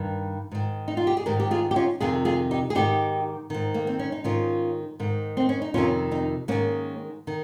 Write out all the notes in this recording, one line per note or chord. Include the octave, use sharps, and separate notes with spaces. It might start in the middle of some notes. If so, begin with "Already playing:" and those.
Already playing: G2 D#3
G#2 D#3
D#4
F4
G4
G#4
G#2 D#3 G4 A#4
G4
F4 G#4
G4
C#4 F4
F2 C3 D#3 F4 G#4
F4 G#4
D#4 G4
G#4
G#2 D#3 D#4 G4
G#2 D#3
A#3
C4
C#4
D#4
G#2 D#3 C#4 F4
G#2 D#3
C4
C#4
D#4
F2 C3 D#3 C#4 F4
C4 D#4
G#2 D#3 A#3 C#4
D#3